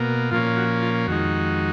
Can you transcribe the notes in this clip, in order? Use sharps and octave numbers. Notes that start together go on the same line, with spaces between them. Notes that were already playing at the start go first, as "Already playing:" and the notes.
Already playing: B2 A#3
A#2 F3 A#3 C#4 F4
F#4
F4
F2 D#3 G#3 D#4 F#4